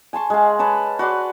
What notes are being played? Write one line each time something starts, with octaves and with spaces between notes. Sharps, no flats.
G#5 A5 C6 C#6
G#3 F5
B4 C#5 A5
F#4 B4 D5 C6